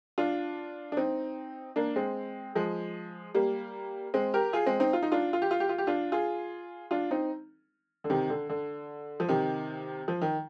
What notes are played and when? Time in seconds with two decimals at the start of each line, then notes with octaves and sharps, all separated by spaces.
0.18 D4 F4
0.92 D4
0.97 C4 D#4
1.76 A#3 D4
1.96 G#3 C4
2.55 F3 G#3
3.34 G3 A#3
4.14 G#3 C4
4.34 G4 A#4
4.53 F4 G#4
4.66 G#3 C4
4.80 C4 D#4
4.93 F4
5.03 D#4
5.12 D4 F4
5.33 F4
5.42 G4
5.51 F4
5.60 G4
5.69 F4
5.78 G4
5.87 D4 F4
6.12 F4 G#4
6.91 D4 F4
7.11 C4 D#4
8.04 D3
8.10 C3 D#3
8.30 D3
8.49 D3
9.20 F3
9.29 C3 D#3
10.08 F3
10.21 D#3